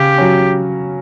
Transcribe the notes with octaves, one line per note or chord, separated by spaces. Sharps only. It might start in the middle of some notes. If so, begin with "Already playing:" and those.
Already playing: C#3 G4
F#3 C#4